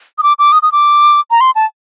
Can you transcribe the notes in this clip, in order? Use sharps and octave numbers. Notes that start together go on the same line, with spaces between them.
D#6
D6
D6
D#6
D#6
D6
A#5
C6
A5